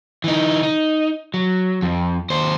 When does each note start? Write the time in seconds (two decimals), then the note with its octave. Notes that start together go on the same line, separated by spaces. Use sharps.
0.24 E3 D#4
0.63 D#4
1.34 F#3
1.82 F2
2.30 D#2 C5